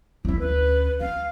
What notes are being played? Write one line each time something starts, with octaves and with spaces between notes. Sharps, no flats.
D2 C#4 E4
B4
C#4 F5